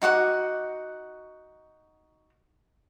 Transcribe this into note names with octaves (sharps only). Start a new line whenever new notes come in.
D#4 F#4 F#5 D6